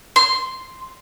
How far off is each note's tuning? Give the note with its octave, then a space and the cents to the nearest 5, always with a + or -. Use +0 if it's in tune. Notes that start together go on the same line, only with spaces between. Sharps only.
C6 +0